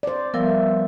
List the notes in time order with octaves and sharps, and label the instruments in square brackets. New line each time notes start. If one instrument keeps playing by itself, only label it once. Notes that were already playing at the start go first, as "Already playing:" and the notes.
[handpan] C5 D5
[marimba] F3 G3 A#4 [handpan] B3 [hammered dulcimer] E5